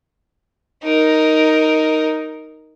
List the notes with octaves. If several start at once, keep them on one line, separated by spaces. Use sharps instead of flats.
D#4 A#4